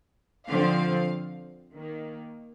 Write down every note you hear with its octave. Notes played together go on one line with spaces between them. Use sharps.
D3 F3 C4 F5
D#3 A#3